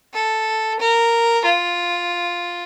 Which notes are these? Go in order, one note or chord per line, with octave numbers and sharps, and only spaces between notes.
A4
A#4
F4